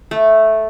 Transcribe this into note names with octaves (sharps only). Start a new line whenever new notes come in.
A3